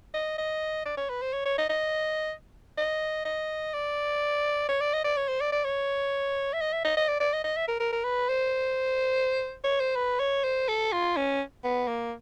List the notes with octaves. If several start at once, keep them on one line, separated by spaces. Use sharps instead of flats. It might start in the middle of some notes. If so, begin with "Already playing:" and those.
D#5
D#5
D5
C#5
B4
C5
C#5
C#5
D#5
D#5
D#5
D#5
D5
C#5
D5
D#5
D5
C#5
C5
D5
D5
C#5
E5
D#5
E5
D#5
D#5
D5
D5
D#5
D#5
E5
A#4
A#4
A#4
B4
C5
C#5
C5
B4
C#5
C5
A4
F4
C#4
B3
A#3